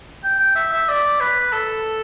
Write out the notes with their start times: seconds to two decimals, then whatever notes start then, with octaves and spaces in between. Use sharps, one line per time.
0.24 G5
0.39 G5
0.55 E5
0.72 E5
0.88 D5
1.20 B4
1.52 A4